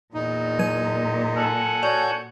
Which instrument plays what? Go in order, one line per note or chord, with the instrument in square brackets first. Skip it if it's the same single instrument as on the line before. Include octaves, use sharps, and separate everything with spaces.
[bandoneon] E2 D#4 [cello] A#2
[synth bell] F#3 G#6 D#7
[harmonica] A4 F#5 G#5
[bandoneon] F#4 C#5 G6 [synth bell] D5